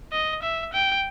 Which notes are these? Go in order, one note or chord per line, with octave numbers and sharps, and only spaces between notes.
D#5
E5
G5